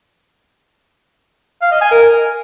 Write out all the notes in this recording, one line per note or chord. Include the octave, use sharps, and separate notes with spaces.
F5
D#5
G#5
A#4